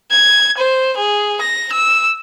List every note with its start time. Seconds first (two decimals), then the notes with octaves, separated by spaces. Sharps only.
0.11 G#6
0.57 C5
0.96 G#4
1.41 A#6
1.72 E6